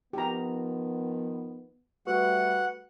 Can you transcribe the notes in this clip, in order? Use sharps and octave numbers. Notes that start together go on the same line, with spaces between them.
D#3 F3 B3 G4 A#5
G3 A3 F#4 B4 F#5 C#6